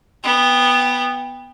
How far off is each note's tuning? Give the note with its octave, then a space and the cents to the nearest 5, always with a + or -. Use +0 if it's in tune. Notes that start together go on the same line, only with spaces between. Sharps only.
B3 +0 G5 +25